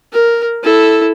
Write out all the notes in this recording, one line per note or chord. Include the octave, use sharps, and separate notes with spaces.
A#4
E4 A4